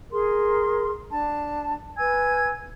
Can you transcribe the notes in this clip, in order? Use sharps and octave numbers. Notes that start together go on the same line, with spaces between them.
G#4 A#4 C6
D4 A5
B4 G#5 E6 G#6